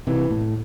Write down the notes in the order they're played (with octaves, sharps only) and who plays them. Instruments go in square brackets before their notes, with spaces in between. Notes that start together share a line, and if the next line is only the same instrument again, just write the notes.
[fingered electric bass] C3 [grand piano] E3
[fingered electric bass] A2